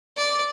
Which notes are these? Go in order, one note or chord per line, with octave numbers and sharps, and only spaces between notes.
D5